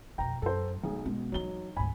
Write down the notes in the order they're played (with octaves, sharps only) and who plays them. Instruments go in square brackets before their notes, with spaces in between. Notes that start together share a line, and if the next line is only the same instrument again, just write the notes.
[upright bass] F2 B2 [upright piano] G5 A#5
[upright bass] F#2 [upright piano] A4 C5
[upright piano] B1 G#4 [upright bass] G#3
[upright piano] B2 [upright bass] G#3 C#4
[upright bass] E3 D#4 [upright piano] F#3 G7
[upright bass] D2 G#2 [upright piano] G#5 B5